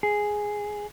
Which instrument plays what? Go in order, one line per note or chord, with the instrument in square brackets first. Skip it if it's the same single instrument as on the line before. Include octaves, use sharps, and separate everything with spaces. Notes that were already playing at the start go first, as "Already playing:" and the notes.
[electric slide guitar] G#4